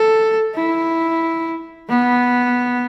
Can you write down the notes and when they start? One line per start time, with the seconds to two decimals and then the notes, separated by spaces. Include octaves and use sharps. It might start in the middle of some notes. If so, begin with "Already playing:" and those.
Already playing: A4
0.55 E4
1.89 B3